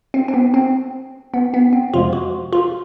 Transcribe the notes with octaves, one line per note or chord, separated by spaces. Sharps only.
C4
C4
B3
C4
B3
B3
C4
F2 C3 F3 G#3 F4
F#4
F4